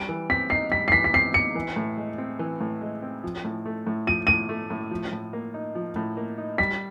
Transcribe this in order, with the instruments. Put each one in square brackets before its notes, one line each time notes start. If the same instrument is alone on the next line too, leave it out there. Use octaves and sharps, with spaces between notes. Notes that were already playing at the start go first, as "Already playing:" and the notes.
Already playing: [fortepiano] G3 [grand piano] D7
[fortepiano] E3
[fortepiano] C4 [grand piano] B6
[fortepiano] D#4 [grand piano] C7
[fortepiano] G3 [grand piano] B6
[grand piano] C7
[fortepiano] E3 [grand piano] B6
[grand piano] B6
[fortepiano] C4 [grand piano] C7
[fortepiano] D#4 [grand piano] C#7
[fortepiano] E3
A2
G#3
C4
E3
A2
G#3
C4
F3
A2
A3
A2
[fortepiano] F3 [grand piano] D#7
[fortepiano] A2 [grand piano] D#7
[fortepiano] A3
A2
F3
A2
A#3
D#4
F3
A2
A#3
D#4
[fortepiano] G3 [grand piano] B6